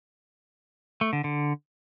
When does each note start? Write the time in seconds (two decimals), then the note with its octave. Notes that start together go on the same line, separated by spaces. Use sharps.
1.01 A3
1.13 D3
1.24 D3